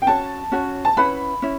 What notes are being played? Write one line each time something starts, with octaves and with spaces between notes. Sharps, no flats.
G5
C#4 F#4 C#5 A5
C#4 F#4 C#5
A5
C#4 E4 B4 F#5 B5
C#4 E4